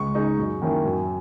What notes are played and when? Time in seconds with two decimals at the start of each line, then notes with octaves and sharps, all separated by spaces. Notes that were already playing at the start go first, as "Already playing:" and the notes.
Already playing: C#2 C#6
0.15 C#3 G#3 D#4
0.39 F#2
0.62 D#3 A#3 C#4 E4
0.85 F#2